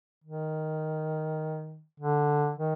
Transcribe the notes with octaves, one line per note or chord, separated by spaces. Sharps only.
D#3
D3
D#3